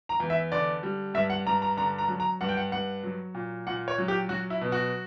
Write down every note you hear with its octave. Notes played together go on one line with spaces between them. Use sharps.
A#5
E2
E5
D3 D5
G3
G2 E5
F#5
G2 A#5
A#5
D3 A#5
A#5
F#3
A#5
G2 F#5
G5
F#5
G2 F#5
F#3
A#2
A#2 F#5
C#5
F#3
G4
F#3 F#4
E4
B2
F#4